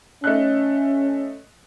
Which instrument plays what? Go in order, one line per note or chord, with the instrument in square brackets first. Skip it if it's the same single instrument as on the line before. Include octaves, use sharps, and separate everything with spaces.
[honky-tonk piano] A3 D#4 F#6 [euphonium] C#4